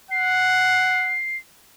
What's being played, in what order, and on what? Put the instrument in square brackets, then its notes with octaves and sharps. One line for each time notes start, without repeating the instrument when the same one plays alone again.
[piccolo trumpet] F#5 [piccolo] C7